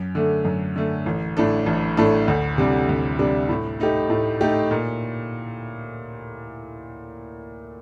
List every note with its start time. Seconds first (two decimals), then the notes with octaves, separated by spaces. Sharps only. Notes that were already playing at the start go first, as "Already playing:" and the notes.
Already playing: F#2
0.15 D3 A3
0.45 F#2
0.76 D3 A3
1.06 A1
1.37 A2 A3 D4 A4
1.66 A1
1.97 A2 A3 D4 A4
2.28 D2
2.58 C3 G3 D4
2.89 D2
3.19 C3 G3 D4
3.49 A2
3.80 A3 D#4 G4
4.10 A2
4.41 A3 D#4 G4
4.71 A#2